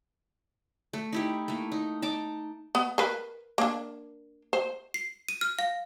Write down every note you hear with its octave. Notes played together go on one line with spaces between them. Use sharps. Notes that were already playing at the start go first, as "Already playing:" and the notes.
A3
D#4 E4 G4
A3 A#3
D#4
D#4 A5 D6
B3
A#4 B4
A#3 D4
C5
C7
D#7
F6
F5